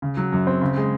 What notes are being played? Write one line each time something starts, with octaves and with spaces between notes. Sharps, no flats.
C#3
F#3
F#2
C4
C#3
G#3